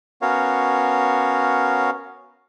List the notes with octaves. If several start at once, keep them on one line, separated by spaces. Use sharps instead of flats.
B3 C#4 F#4 A#4 C#5 F5